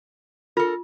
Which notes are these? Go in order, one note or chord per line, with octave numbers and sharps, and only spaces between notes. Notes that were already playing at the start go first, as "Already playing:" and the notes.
F4 A4 A#4